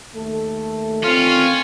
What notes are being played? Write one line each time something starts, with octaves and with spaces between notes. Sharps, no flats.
D#2 A3 A4
D3 D#3 C4 C#4 F4